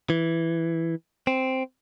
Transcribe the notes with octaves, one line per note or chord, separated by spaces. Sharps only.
E3
C4